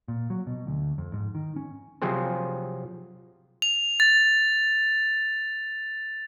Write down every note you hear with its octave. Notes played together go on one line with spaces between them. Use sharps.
A#2
F#3
B2
D2
F2
G#2
D#3
C#4
C3 F3 F#3 C4 G#4 C5
F7
A6